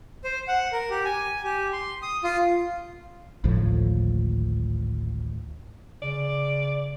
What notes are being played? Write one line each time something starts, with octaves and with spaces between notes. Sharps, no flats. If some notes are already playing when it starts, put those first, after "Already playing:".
C5
F#5
A#4
G4
G#5
G4
C6
D#6
F4
G#1 D2 A2 F3
C#3 D5